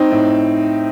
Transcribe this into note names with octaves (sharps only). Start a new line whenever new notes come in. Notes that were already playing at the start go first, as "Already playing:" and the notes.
Already playing: C4 D#4
A2